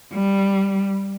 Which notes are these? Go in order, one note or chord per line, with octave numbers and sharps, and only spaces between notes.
G3